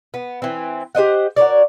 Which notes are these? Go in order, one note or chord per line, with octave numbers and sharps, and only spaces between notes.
B3
E3 C4
G4 C5 D#5 F#5
F#4 A#4 C#5 D5